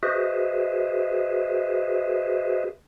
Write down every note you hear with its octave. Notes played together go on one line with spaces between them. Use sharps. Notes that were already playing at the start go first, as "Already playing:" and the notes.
F#4 G#4 B4 C5 D#5 E5